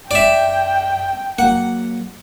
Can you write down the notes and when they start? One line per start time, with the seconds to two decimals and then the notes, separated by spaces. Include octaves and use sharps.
0.11 F#2 D5 E5 G5
1.39 F#3 A#3 F#5